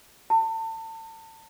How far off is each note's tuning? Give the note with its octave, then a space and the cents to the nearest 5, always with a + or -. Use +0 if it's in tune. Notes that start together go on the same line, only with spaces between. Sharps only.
A5 +35